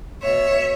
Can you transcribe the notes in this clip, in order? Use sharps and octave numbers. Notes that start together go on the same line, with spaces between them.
B2 C#5 E5